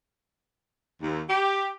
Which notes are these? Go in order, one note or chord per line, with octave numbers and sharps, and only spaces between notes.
D#2
G4